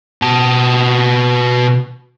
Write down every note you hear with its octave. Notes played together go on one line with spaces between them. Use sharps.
B2 A5